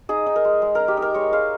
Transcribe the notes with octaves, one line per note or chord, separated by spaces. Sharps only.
D#4 G#4
D#4
A#4
G#3
G#3
D#4 A#4
G4
D#4
A#4
G#3 C#5
G#3 F5